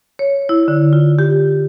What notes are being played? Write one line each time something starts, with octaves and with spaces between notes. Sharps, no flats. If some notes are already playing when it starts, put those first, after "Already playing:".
C#5
E4
D3
F4
G4